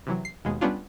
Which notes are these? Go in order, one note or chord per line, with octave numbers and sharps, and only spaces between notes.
C3 E3 F#3
C7
D#2 B2 G#3
G3 B3 C#4 D4 F4